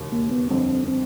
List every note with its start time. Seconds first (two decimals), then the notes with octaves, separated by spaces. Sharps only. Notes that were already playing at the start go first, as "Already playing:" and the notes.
Already playing: E1 D#2 C#3
0.12 A#3
0.31 B3
0.50 G1 F2 D3 C4
0.88 C4